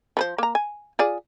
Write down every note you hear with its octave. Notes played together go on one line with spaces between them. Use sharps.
F3 B4 C5
A#3 A#5
G#5
F4 G#4 D5